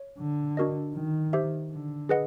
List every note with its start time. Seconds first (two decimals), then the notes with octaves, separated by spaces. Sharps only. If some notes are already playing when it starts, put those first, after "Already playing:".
Already playing: C#5
0.20 D3
0.57 D4 F#4 A#4 D#5
0.95 D#3
1.33 G4 C5 E5
1.72 D3
2.09 G#4 B4 D#5 F#5